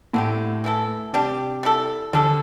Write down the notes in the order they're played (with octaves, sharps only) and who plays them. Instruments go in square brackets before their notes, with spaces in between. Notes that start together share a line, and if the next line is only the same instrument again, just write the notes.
[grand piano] A2 [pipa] D3 C4 G4
[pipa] E3 A3 E4 A4
[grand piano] C3 [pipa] G3 D4 G4
[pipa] G3 E4 A4
[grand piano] D3 [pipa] G3 D4 A4